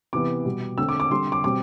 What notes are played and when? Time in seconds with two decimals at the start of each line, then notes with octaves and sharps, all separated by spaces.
0.13 C3 E3 B3 D6
0.45 B2 G3 B3
0.78 D3 A3 C4 E6
0.89 D6
1.00 D6
1.11 D3 G3 C4 C6
1.32 D6
1.44 B2 G3 C4 D6